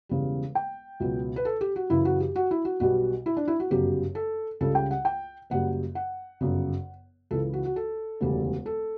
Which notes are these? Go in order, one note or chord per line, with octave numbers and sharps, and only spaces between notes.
E1 E2 C#3 G3
G5
C#2 B2 F#3
B4
A4
G4
F#4
F#2 C#3 E3 E4
F#4
G4
F#4
E4
F#4
B1 B2 G3 F#4
E4
D4
E4
F#4
G1 F#2 C#3 F#3 G4
A4
C#2 C#3 G3 A4
G5
F#5
G5
F#1 F#2 C#3 G3 F#5
F#5
G1 F#2 C#3
C#2 C#3 E3 A4
F#4
F#4
A4
E1 D2 C#3 G3
A4